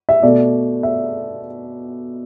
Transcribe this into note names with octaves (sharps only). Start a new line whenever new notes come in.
E5
B2 A3 D5
E5